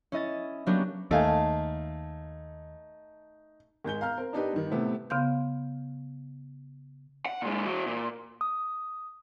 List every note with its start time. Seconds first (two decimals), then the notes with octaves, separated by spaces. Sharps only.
0.12 C#4 E4 D#5 A6
0.66 F#3 A#3 B3 C#4 D4 G4
1.11 D#2 A3 D#4 F5 G#5 A5
3.84 G#1 G#3 G6 G7
4.01 F5 A#5 F6 G6
4.18 C4 A#4
4.33 D4 D#4 G4 B4
4.53 G2 D#3
4.71 A2 C3 A3 B3
5.10 C#3 B3 F5 C6 G6
7.26 F#5
7.42 A#2 G#3
7.65 E3 F#4
7.86 A#2
8.41 D#6